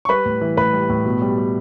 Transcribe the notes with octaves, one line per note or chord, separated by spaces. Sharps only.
C#6
G3 B4 B5
A2
E3
A2 B4 B5
G3
A2
B2
G3
G3